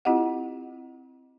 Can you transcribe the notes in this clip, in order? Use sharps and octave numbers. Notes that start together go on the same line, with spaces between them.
C4 E4 F4 G4 D#5 F#5